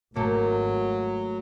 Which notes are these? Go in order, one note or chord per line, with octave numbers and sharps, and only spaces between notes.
G#1 F#3 A3 A#3